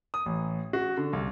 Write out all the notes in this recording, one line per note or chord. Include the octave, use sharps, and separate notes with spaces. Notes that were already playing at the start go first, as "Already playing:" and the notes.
D#6
A1
F#4
D3
C2